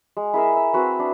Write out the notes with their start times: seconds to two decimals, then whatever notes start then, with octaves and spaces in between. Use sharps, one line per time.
0.17 G#3
0.34 E4 G#4 A#4 E5
0.56 E5
0.73 C4 F#4 B4
0.99 D4